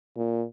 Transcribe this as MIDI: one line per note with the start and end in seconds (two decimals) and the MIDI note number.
0.16 0.45 46